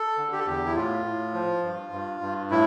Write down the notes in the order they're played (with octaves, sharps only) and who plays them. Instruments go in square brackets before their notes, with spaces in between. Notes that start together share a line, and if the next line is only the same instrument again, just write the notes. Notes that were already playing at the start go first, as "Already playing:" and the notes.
Already playing: [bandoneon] A4
D3
G4
A4
E2 G4
E4
A2 F4
A2
F3
G2
G2
G2
A2 E4